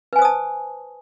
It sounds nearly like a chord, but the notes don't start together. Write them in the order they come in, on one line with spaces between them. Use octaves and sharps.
B4 G#5 C5 D#6 A5